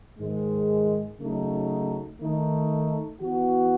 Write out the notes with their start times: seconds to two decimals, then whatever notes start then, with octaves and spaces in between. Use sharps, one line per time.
0.19 G#2 D#3 G#3
1.19 C#3 F#3 A3 D#4
2.19 D#3 A3 D#4
3.20 E3 B3 F#4